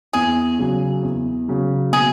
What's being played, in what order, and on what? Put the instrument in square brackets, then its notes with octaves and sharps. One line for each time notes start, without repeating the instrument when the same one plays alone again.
[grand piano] E2 [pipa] G#4
[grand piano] C#3 F#3
E2
C#3 F#3
[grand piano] B2 [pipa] G#4